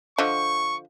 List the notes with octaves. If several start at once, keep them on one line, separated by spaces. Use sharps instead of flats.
D3 F3 D#5 C#6